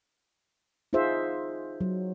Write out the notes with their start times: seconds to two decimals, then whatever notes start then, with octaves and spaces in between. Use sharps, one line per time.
0.93 D#4 F4 G#4 C5 E5
1.81 F#3